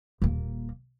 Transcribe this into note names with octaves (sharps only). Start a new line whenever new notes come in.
D#1 A#3